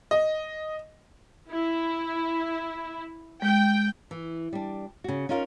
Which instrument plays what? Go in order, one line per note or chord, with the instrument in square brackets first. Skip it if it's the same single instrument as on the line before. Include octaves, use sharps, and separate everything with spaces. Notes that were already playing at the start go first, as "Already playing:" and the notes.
[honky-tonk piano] D#5
[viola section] E4
[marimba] G#3 [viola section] G5
[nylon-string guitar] E3
G3 D4
C#3 F#4
C#4 D#4 F4 A#4 D#5 F5